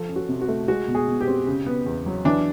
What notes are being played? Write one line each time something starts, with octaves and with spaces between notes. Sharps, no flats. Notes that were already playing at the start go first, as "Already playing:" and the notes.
Already playing: F3 A4
C#4
F#4
C3
F#4
A3
G#3 F#4
B2
G#4
B2
G4
C4
C#3
B3
E2
F#3
E3 D4